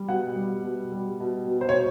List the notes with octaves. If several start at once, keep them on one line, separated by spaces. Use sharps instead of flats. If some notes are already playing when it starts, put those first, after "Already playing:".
Already playing: G3
B2 F#5
G3
B2
G3
B2
B2
C5
C#5
B2